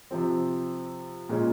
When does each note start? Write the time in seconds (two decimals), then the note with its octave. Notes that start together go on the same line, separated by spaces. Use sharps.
0.11 C3 F3 C4
1.29 A#2 G#3 C#4 F4